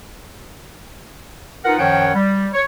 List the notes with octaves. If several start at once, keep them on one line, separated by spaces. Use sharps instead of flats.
D#4 F4 A#4 B4 F#5
F#2 D#3 F3 C#5 F#5 G5
G3
C#5